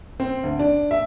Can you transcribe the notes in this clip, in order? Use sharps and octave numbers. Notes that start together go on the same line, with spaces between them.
C4
D2
D4
E5